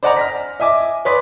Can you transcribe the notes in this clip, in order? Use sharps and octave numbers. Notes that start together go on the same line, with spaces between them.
C5 D5 D#5 F#5 G#5 A#5
F6 A#6 B6
D#5 E5 G#5 D6
B4 C#5 D5 C6 D#6 B6